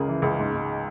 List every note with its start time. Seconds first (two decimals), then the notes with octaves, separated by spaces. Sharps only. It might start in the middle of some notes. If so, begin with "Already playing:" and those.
Already playing: C#2 C#3 G#4 A#4
0.08 E3
0.22 C#2
0.38 G#2
0.53 G#2